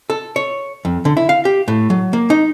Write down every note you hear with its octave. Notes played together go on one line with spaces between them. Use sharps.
A4
C#5
F2
D3
E4
F5
G4
A2
F#3
A#3
D#4